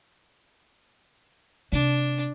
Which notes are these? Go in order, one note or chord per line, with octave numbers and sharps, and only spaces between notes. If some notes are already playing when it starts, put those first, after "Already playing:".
C3 D4